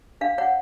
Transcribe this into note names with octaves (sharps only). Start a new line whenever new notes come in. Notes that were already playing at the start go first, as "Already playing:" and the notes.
D4 F5
C#5 F#5